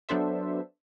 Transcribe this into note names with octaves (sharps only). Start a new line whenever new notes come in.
F#3 B3 D4 A4 C5 E5